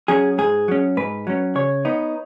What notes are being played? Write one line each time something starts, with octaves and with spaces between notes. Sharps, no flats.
F#3 C#4 G#4
G#2 G#4
F#3 C#4
G#2 B4
F#3 C#4
C#3 C#5
B3 D#4